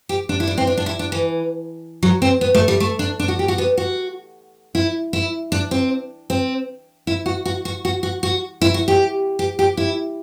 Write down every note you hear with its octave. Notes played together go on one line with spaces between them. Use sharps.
G4
D4
E4
D4
C4
D4
D4
E4
D4
E3
F#3
C4
B3
A3
G3
A3
D4
D4
F#4
G4
F#4
B3
F#4
E4
E4
D4
C4
C4
E4
F#4
F#4
F#4
F#4
F#4
F#4
E4
F#4
G4
G4
G4
E4